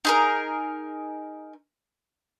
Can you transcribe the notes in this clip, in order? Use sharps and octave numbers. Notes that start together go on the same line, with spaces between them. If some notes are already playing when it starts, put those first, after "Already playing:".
D#4 G#4 A#4